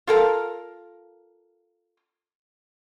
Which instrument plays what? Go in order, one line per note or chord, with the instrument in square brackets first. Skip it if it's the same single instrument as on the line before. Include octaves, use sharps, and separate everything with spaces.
[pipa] F4 A4 A#4 F5